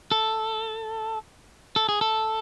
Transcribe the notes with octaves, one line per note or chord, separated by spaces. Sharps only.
A4
A4
G#4
A4